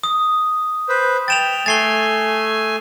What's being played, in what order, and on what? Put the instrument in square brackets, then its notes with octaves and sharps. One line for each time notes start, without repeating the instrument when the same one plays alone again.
[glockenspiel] D#6
[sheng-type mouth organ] B4 C5
[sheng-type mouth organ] G5 [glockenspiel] A6 E7 F7
[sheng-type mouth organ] A3 G#5 [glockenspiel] A6 C7 G7